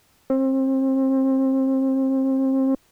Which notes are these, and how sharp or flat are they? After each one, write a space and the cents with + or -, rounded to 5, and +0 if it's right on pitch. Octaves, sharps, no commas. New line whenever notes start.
C4 +30